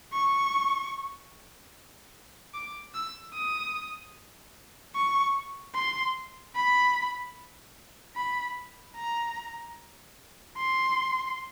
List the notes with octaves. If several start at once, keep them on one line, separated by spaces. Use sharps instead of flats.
C#6
D6
E6
D#6
C#6
C6
B5
B5
A#5
C6